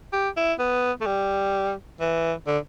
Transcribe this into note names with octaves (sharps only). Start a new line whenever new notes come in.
G4
E4
B3
A3
G3
E3
D3